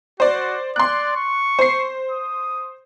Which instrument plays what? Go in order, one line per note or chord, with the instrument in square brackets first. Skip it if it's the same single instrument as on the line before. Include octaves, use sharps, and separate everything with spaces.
[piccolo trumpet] F#4 [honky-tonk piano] C5 D5
[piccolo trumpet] D5 [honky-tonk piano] C6 F#6
[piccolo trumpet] C#6
[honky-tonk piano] C5 C7
[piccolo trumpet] D#6